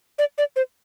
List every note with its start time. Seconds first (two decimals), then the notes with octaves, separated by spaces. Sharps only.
0.19 D5
0.38 D5
0.56 C5